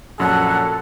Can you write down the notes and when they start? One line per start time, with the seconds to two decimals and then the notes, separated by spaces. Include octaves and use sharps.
0.19 A#1 F#2 A4 F#5